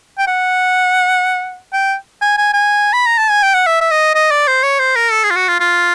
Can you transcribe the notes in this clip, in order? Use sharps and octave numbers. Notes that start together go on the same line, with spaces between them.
G5
F#5
G5
G#5
G#5
G#5
B5
A#5
A5
G#5
G5
F#5
E5
E5
D#5
D#5
D5
C5
C#5
C5
A#4
A4
G#4
F4
F#4
F4
F4